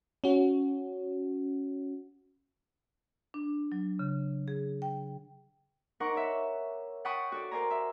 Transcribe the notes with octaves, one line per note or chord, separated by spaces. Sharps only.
C#4 F#4
D4
F#3
C#3
G#4
G5
D#4 A#4 C5 F#5 C#6 D6
C#5 E5
F#5 G5 A5 B5 C#6 D#6
F#4 A4 D5
A#4 C5 D5 G#5 A#5
E5